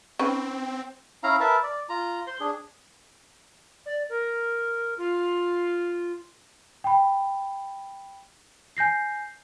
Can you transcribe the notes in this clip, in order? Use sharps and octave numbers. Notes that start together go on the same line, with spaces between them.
C4 C#4 D#4 B4
C#4 E4 F5 A#5
A#4 B4 E5 A5
D5
F4 A#5
C5 C6
D4 G#4
D5
A#4
F4
G5 B5
G#5 G6 A#6 C7